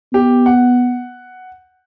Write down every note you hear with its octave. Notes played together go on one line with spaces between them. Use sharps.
B3 G4
F#5